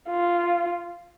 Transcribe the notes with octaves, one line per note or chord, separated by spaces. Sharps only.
F4